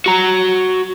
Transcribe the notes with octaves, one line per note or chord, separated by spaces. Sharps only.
F#4 A#5